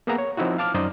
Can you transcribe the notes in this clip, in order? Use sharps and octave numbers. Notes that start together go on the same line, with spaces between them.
A#3 B3 G#4 E5 F#5 A#5
C#5
F3 C4 D#4 E4 F#4
F5 A5 D6 F6
F#2 D#4 C5 D5 D#5